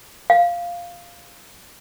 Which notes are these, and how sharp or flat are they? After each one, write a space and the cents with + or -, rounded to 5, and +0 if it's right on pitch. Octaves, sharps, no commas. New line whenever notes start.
F5 -5